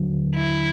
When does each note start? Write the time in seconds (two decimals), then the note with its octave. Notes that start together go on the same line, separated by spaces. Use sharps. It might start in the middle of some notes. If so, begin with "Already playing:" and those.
Already playing: D#2 D3 F#3
0.35 E4